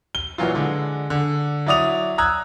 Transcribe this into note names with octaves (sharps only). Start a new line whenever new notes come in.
G7
A#2 E3 F#3 F4
D3 G#3
D3
F#3 E4 D5 D#6 F7
A#5 D#6 E6 F#6 G#6